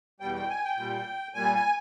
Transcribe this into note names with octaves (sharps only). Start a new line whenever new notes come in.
E2 B2 G3 G5
G5
G#5
G5
A#2 G3
A#2 G3 G#5
G#5